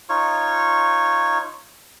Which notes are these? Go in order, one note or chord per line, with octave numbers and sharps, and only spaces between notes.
D#4 F4 C#5 C#6